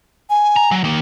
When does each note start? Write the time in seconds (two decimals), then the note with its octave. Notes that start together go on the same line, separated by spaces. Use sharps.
0.30 G#5
0.56 A#5
0.71 F#3
0.84 D#3 A#3